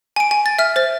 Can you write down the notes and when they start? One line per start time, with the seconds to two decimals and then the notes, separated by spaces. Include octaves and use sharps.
0.16 G#5 D7
0.31 G#5
0.46 A6
0.59 E5 F6
0.76 C5 A6